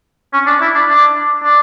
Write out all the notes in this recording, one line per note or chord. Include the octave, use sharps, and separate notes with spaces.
C#4
D4
E4
D4
D4
D4